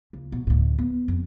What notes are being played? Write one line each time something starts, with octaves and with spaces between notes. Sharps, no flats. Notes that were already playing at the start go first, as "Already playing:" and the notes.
C#2
B2
D2 A2
B3
F2